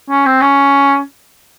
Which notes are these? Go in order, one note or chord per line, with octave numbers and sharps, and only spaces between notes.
C#4
C4
C#4